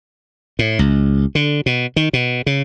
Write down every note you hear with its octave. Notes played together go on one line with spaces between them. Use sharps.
A2
C#2
D3
B2
D#3
B2
C#3